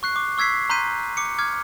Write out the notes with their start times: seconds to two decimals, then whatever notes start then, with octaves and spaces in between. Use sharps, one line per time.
0.03 C#6 F#6 C7
0.16 C#6 D6
0.38 C#6 E6 G#6 B6 C7
0.70 A#5 C6 F#6 G6 B6 D#7
1.17 D6 C#7
1.38 D6 F6 G#6